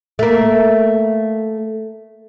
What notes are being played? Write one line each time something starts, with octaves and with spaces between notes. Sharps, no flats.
A3 A#3